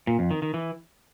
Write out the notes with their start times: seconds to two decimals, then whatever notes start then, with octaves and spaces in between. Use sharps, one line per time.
0.07 A#2
0.19 F2
0.31 D#3
0.42 D#3
0.54 E3